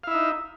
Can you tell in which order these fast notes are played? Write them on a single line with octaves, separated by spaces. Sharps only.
F5 E4 E5 D#4